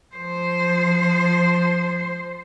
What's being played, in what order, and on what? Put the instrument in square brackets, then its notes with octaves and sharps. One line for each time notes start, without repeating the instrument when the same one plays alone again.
[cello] F3 C5